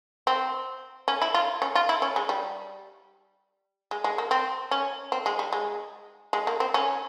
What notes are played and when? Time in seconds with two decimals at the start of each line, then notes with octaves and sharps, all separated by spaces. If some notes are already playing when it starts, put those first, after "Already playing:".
0.27 C4
1.08 C#4
1.22 E4
1.34 F4
1.62 C#4
1.75 F4
1.89 E4
2.02 C#4
2.16 G#3
2.29 G3
3.91 G#3
4.04 G#3
4.18 A#3
4.31 C4
4.71 C#4
5.12 C4
5.26 G#3
5.39 G3
5.53 G#3
6.33 G#3
6.47 A#3
6.60 C4
6.74 C#4